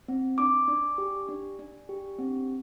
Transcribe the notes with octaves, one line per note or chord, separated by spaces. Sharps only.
C4
D4 D6
D4
G4
D4
D4
G4
C4